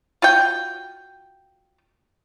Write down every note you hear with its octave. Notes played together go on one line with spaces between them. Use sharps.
F4 F#4 G5